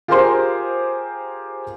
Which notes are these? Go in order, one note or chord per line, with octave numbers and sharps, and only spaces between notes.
F4 G4 G#4 A#4 C5 C6